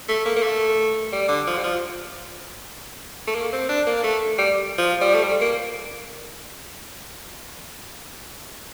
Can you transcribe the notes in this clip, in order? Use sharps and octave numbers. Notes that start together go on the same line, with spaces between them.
A3
A#3
A#3
A3
G3
D3
F3
G3
F3
A3
A#3
C4
D4
A#3
A3
G3
F3
G3
A3
G3
A#3